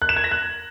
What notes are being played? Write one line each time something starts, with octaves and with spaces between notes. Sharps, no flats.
F#6
E7
G#6
A#6
F#6